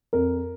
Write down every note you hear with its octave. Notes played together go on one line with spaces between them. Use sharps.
F2 A#4